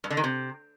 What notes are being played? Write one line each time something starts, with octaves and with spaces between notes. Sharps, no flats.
G2
D3
D#3
C3